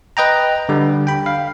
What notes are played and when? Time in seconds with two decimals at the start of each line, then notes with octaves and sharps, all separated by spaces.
0.17 B4 D#5 G5 A#5
0.69 D3 G3
1.07 G5 B5
1.26 F5